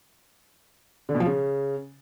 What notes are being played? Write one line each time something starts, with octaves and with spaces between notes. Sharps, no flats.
D3
B2
F3
C#3